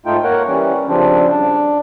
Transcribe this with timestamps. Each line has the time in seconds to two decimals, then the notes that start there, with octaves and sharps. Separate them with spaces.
0.06 G#2 A3 D#4 F4 G5
0.24 A#3 A#4 C#5 F#5
0.48 E3 G3 C#4
0.88 C#3 F3 G3 C4 D4
1.30 D4